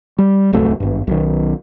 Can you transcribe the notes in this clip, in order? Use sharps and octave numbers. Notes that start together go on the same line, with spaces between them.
G3
D1 C2 F#2 A3
G#1 G2
B1 D#3